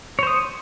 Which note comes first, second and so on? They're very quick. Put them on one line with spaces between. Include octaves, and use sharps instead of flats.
C#5 C5 D#6